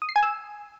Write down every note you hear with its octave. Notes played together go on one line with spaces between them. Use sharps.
D#6
C7
G#5
E6